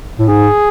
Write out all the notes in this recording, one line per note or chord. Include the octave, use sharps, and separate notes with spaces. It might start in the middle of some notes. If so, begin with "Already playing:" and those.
A2
G#2 G#4